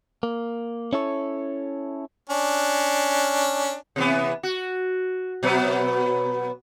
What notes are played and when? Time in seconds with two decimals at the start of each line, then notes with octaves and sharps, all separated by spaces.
0.23 A#3
0.93 C#4 E4 A4 C#5
2.29 C#4 D4
3.96 C3 E3 B3
4.43 F#4
5.43 B2 F#3 B3